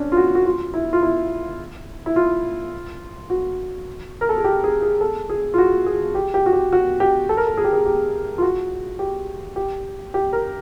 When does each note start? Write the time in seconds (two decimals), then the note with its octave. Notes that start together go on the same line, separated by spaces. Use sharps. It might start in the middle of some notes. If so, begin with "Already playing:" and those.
Already playing: C#4 D4
0.12 F4
0.17 F#4
0.35 F#4
0.45 F4
0.74 E4
0.93 F4
1.03 E4
2.06 E4
2.16 F4
3.30 F#4
4.21 A#4
4.29 A4
4.37 G#4
4.44 G4
4.64 G#4
4.82 G#4
5.01 A4
5.29 G#4
5.54 F4
5.58 F#4
5.86 G#4
6.15 G4
6.34 G4
6.46 F#4
6.53 G4
6.73 F#4
7.00 G4
7.29 A4
7.37 A#4
7.47 A4
7.57 G#4
7.64 G4
7.73 G#4
7.86 G4
8.38 F4
8.42 F#4
8.99 G4
9.56 G4
10.14 G4
10.33 A#4